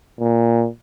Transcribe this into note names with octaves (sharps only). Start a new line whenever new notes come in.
A#2